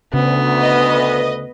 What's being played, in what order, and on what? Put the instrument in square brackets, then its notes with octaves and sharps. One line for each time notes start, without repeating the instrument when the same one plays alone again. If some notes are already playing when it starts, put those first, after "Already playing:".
[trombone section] D2 [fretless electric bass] C#3 [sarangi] B3
[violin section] B4 D#5